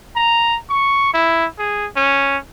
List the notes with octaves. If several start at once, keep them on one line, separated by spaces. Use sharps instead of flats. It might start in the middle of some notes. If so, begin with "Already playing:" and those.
A#5
C#6
E4
G#4
C#4